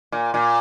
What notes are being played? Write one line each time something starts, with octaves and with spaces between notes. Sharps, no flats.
A#2
A#2